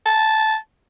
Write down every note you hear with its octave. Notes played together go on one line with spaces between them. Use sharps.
A5